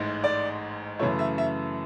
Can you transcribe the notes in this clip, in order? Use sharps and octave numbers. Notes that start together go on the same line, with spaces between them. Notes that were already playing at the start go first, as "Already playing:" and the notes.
Already playing: A1 G#2 G#3
D5
F#2 C#3 E3 A3 C#5
E5
E5